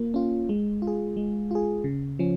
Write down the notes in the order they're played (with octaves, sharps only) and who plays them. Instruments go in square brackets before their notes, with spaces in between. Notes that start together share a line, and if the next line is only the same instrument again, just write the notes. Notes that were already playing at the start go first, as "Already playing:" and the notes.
Already playing: [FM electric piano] A#3 F4
C#4 F4
G#3
F4
G#4
G#3
F4 G#4
C#3
F3 C#4